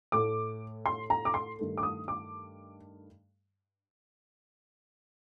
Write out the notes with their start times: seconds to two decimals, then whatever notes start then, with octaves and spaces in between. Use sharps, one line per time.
0.12 A2 A3 D6
0.86 C6
1.10 A#5
1.25 D6
1.34 C6
1.59 G2 D#3 A3
1.77 D6
1.83 D#6
2.08 D6